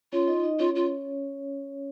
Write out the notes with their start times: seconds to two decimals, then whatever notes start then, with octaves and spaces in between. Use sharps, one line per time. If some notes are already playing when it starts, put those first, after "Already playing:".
0.13 C#4 F4 C#5
0.28 D#4 D#5
0.44 D#4 D#5
0.59 C#4 F4 C#5
0.75 F4